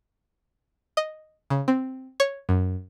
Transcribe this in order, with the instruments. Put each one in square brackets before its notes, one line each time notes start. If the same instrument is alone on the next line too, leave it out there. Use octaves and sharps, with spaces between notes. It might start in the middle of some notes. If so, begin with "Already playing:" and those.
[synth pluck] D#5
C#3
C4
C#5
F#2